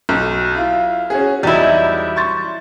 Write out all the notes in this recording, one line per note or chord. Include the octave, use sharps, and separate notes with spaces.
B1
E4 F4
C#4 F#4 G#4
E2 F#3 G3 D#4 E4
C6 C#6 A6